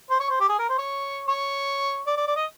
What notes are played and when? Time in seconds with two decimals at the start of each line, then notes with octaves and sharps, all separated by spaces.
0.10 C5
0.20 C#5
0.29 C5
0.40 G4
0.49 G#4
0.59 A#4
0.69 C5
0.78 C#5
1.28 C#5
2.07 D5
2.17 D5
2.27 D5
2.36 D#5